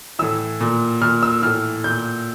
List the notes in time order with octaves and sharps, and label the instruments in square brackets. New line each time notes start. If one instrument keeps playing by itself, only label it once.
[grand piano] A2 E3 E6
A#2
A#2 F6
E6
A2 E3 F6
A#2 G6